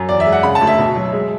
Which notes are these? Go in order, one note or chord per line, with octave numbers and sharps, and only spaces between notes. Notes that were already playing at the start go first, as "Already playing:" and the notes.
Already playing: F#2
E2 D5
E5
G#3
F#5
C#3 B5
A5
D2
E5
B2
F#3
G#3